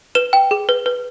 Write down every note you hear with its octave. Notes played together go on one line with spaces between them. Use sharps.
B4 E7
G5
G#4
B4
B4